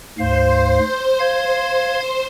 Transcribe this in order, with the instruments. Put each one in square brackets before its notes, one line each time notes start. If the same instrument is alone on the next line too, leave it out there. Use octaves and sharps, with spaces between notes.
[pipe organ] D2 G#2 F5 [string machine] C5
[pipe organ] F5 G#6